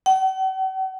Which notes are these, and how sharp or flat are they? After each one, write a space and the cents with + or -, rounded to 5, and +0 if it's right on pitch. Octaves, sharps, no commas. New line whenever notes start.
F#5 +45